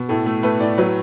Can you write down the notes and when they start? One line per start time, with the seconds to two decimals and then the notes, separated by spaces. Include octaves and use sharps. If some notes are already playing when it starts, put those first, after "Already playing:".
Already playing: B2
0.09 A2 A4
0.26 A3
0.43 A3 B4
0.60 A2 D5
0.78 F#3 B4